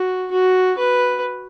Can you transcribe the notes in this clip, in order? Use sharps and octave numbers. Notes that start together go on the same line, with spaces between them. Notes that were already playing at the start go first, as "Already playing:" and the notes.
Already playing: F#4
F#4
B4